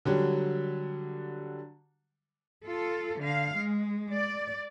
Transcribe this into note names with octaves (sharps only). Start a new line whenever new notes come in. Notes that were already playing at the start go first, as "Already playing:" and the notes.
D3 F#3 G3
F4 A4
D3 F5
G#3
D5